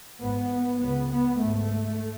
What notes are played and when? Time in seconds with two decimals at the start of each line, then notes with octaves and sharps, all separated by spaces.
0.21 G#1 G#2 B3
0.81 C#2 C#3 B3
1.12 B3
1.41 G#1 G#2 A3